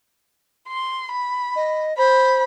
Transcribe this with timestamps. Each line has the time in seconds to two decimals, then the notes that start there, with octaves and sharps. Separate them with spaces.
0.68 C6
1.12 B5
1.56 D#5
1.98 C5 B5